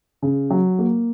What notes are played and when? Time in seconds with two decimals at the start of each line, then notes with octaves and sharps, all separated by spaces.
0.22 C#3
0.50 F#3
0.79 A#3